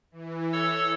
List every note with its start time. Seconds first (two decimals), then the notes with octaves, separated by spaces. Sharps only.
0.12 E3
0.53 A4 C#5 E6